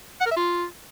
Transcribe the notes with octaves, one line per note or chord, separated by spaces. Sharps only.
F#5
A#4
E5
F4